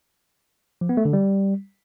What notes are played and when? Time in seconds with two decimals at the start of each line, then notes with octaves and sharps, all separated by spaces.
0.81 F3
0.89 B3
0.97 A3
1.05 D3
1.13 G3